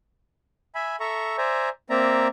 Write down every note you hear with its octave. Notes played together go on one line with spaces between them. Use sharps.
E5 G#5 B5
A4 E5 A#5 C#6
C5 D5 E5 G#5 A#5
A#3 C4 D5 E5 A#5